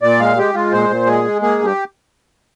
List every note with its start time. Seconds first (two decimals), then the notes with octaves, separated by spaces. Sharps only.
0.02 A#2 D5
0.20 G#3 F5
0.37 G#3 G4
0.54 G#3 F4
0.72 A#2 C5
0.90 A#2
1.07 G#3 G#4
1.24 G#3
1.42 A#3 G#4
1.59 G2
1.65 G4